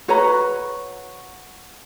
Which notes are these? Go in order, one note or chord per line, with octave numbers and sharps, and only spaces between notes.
F#4 B4 C#5 A#5